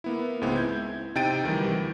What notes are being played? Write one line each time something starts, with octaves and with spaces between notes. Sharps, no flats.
A#3 B3 E4
C#2 G#2 G#3 B3 C4
E4 G6 G#6
C3 D#4 G5 A6 D7 D#7
D2 D#3 E3 G3